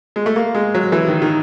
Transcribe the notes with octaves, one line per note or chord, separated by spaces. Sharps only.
G#3
A3
A#3
G#3
F#3
E3
D#3
D#3